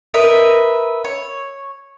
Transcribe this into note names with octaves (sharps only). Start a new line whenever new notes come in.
A#4 B4 D#5 E5
C#5